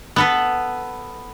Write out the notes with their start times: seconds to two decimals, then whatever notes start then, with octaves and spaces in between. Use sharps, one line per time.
0.16 B3 A4 B4